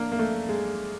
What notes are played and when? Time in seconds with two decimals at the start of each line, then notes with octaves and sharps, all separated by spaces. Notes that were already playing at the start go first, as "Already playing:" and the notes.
Already playing: A#3 D4
0.12 A#3
0.19 A3
0.49 G#3